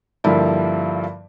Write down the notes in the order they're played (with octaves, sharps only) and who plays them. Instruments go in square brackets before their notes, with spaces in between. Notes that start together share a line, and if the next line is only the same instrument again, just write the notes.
[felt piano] G2 D3 F3 G3 A#3 E4